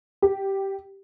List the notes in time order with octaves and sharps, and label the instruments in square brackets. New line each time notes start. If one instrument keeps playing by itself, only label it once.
[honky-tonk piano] G4